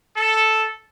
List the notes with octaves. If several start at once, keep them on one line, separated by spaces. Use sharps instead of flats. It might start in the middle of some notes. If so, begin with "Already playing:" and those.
A4